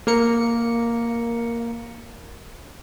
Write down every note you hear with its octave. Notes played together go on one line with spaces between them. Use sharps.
A#3 A#4 C#7